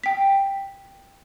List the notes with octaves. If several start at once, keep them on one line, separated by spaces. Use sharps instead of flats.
G5 B6